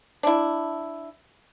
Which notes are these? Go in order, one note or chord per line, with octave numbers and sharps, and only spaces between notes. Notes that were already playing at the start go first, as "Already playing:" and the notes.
D4 E4